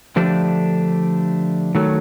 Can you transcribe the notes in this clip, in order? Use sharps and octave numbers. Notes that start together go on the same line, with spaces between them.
D3 F3 A3 D4 G4
D#3 F#3 A3